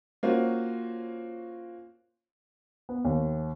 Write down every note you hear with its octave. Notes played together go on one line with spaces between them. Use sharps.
A#3 C#4 F4 F#4 C5
B3
D#2